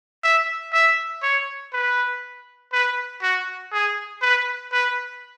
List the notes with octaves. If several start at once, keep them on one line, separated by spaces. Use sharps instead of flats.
E5
E5
C#5
B4
B4
F#4
G#4
B4
B4